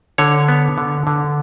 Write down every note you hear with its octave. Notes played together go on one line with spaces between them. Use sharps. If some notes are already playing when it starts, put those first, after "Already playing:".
D3 C#5
B3
D3
D3